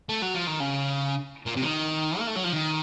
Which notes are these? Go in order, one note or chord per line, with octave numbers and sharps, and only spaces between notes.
A3
F#3
F3
D#3
C#3
A#2
C3
F3
D#3
A#3
A3
F#3
F3
D#3